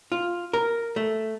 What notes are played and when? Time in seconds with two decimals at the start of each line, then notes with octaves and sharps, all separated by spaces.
0.12 F4
0.53 A#4
0.96 A3